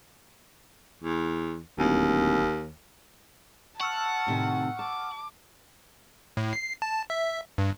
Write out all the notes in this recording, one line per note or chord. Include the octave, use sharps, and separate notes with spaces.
E2
D1 D#2
F#5 A5 C#6 E6 F6
A2 C3 D#3
A5 D6
A2
C7
A5
E5
G2